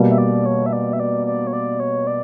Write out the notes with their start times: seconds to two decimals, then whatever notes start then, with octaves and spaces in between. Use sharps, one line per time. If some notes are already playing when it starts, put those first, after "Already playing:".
Already playing: B2 G3 A#3
0.10 E5
0.18 D5
0.46 C#5
0.66 E5
0.73 D5
0.93 E5
1.00 D5
1.26 D5
1.47 C#5
1.53 D5
1.80 C#5
2.07 D5